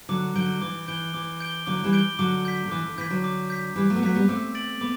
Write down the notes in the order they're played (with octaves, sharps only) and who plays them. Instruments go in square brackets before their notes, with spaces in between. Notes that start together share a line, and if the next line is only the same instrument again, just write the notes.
[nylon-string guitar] D3 F#3 [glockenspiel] D6
[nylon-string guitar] D3 F#3 [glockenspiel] G6 D7 G7
[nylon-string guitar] E3 [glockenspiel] D6
[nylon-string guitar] E3 [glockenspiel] G6 D7 G7
[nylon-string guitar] E3 [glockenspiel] D6
[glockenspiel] G6 D7 G7
[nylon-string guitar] D3 F#3 [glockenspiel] D6
[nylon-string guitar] E3 G3
[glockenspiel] G6 D7 G7
[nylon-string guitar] D3 F#3 [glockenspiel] D6
[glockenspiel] G6 B6
[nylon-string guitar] D3
[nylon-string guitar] E3 [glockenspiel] D6
[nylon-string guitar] D3
[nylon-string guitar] E3 [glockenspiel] G6 B6
[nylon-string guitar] D3 F#3
[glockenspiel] D6
G6 B6
[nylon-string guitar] E3 G3 [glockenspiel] D6
[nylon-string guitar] F#3 A3
B3
[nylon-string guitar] F#3 A3 [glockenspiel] G6 B6
[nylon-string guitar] G3 B3
[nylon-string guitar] A3 C4 [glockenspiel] D6
[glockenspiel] A6 D7 F#7
[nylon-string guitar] B3 [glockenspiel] D6